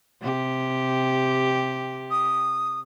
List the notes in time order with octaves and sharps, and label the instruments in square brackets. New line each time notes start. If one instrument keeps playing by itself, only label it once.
[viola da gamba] C3 G4
[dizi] D#6